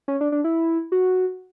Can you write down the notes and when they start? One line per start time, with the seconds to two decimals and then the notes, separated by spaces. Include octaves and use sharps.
0.08 C#4
0.21 D4
0.32 D4
0.44 E4
0.92 F#4